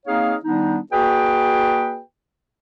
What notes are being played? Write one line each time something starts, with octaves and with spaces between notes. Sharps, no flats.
A#3 C4 D#4 G#4 C#5 F5
D#3 G3 B3 D4 D#4
A#3 F#4 G#4 B4 D5 G5